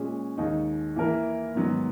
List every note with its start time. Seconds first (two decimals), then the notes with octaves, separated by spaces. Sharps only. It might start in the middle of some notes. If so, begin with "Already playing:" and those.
Already playing: A#2 G#3 C#4
0.37 D#2 D#3 G#3 D#4
0.96 E3 A#3 E4 A#4
1.55 G#2 D#3 F#3 B3